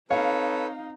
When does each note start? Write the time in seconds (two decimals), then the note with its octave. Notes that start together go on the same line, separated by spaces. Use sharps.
0.11 C4 D#4 A4 B4 C#5 F5